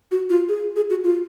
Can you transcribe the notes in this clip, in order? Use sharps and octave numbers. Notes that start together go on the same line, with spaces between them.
F#4
F4
G#4
G#4
F#4
F4